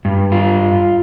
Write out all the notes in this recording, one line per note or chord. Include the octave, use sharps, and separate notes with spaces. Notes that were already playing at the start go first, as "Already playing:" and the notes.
G2
F4